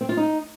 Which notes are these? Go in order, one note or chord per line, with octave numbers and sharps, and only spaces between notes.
C4
F4
D#4